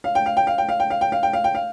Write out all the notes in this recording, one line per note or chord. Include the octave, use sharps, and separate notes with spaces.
F5
G5
F5
G5
F5
G5
F5
G5
F5
G5
F5
G5
F5
G5
F5